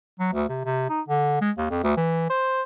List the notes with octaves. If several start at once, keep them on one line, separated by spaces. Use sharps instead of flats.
F#3
D2
C3
C3
D#4
D3
G#3
D#2
F2
D2
E3
C5